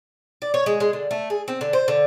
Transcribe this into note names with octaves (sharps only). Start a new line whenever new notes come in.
D5
C#5
G#3
G#3
D3
A3
G#4
C4
D3
C5
D3